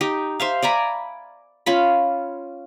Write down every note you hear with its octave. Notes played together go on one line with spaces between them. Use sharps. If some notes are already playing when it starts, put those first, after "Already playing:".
D#4 G4
C5 E5 F5
D5 G#5 A#5 B5
C#4 F4 B5